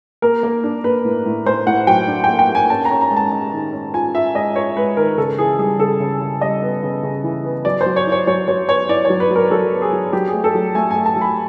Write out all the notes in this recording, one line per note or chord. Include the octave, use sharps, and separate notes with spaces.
A#3 A#4
A#3
D4
A#3 B4
A2
A2
A2 C5
A2 F#5
F#3 G5
D4
A#3 G5
G5
A#3
G#5
C#4 A5
A#5
C#4
A#5
G#3
A5
G#3
D#3
C#4
F4 G#5
F4 E5
G#3 D#5
F4 C#5
G#3 B4
D#3 A#4
C#3 A4
E3 G#4
G3 G#4
C#3 A4
C#3
C#3
G3 D#5
B3
C#3
C#3
E3
B3
F#3 D5
C5
F#3
C#5
E4
C#5
F#3 C#5
F#3 C#5
B3 C#5
E4 D5
C#5
F#3
B4
F#3
A#4
F#3 A4
B3
G#4
F#3
F#3 G4
A3 G#4
A4
F#3
A3 G#5
A3 G#5
A5
F#3
B5